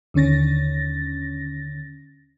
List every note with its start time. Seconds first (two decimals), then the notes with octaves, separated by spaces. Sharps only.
0.14 D#2 D3 C#4 A6 A#6